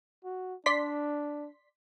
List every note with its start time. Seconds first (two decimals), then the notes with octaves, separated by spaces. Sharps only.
0.24 F#4
0.66 D4 D5 C6 B6